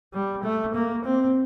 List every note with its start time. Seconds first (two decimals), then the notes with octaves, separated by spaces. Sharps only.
0.14 G3
0.43 A3
0.74 A#3
1.05 C4